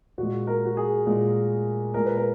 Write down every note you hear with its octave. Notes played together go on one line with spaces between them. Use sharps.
A#2 G#3 F#4
A#4
F#4
G#4
A#2 G#3
A#2 G#3 A#4
B4
A#4